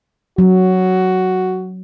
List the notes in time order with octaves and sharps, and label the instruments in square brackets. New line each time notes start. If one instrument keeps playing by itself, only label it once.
[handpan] F#3 [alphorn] F#4